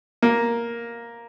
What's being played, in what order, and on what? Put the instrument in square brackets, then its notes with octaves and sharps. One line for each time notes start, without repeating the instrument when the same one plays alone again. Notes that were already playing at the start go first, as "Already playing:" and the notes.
[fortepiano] A#3